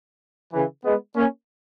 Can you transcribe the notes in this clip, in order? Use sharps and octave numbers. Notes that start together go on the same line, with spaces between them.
C#3 E3
G#3 B3
A#3 C#4